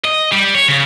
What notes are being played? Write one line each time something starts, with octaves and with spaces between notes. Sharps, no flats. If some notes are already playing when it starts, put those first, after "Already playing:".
D#5
G3
C#5
C#3